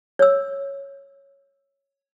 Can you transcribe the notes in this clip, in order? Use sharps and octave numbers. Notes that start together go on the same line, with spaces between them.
C#5 E6